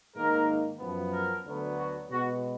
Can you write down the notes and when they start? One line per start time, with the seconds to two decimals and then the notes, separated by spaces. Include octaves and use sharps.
0.15 G#2 D#3 A#3 A#4
0.80 F#2 F3 B3
1.13 A#4
1.45 D2 D3 F#3 B3
1.78 F#4
2.10 B2 G#3 B3 F#4